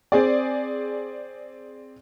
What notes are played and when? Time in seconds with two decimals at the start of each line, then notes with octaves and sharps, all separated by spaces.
0.12 C4 G#4 D5